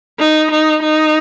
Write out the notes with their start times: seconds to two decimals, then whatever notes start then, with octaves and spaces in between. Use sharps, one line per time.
0.20 D#4
0.50 D#4
0.82 D#4